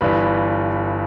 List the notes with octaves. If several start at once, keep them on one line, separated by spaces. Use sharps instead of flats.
G1 G2 E3 G3 B4